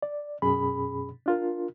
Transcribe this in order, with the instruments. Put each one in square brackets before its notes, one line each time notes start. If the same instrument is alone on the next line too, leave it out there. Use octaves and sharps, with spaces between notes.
[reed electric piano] D5
F#2 B2 C#4 G#4 B5
D4 F4 A#4